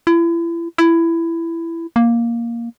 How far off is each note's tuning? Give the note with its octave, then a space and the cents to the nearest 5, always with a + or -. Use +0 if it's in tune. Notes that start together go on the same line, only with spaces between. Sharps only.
E4 +35
E4 +15
A#3 +5